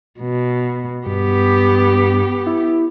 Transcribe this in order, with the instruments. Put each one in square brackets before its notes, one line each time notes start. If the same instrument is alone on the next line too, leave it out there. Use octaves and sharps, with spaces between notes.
[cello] B2
[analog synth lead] G2 [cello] B3 G4
[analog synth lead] E4